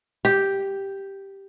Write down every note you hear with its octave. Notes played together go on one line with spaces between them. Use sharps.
G4